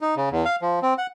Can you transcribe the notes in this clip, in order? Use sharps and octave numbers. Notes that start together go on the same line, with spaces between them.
D#4
C#3
E2
F5
F3
C4
F#5